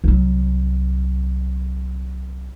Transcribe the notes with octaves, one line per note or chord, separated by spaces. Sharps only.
C2 F#3